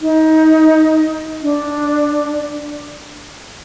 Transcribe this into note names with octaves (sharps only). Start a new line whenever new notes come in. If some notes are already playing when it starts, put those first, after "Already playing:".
D#4
D4